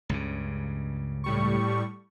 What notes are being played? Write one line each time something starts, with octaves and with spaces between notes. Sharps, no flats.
C#2 G2 C#3
A2 G3 C#6